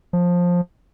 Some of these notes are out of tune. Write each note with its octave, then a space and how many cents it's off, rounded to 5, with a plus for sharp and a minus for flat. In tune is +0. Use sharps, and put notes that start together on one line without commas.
F3 +15